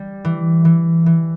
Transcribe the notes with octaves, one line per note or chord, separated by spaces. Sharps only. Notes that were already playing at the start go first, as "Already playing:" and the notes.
Already playing: G3
E3
E3
E3